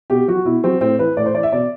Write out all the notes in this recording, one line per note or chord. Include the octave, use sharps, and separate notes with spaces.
B2 G4
F#3 F#4
B2 E4
F#3 C4
A2 C4
E3 B4
A2 D5
C5
E3 D5
E5
B2 D5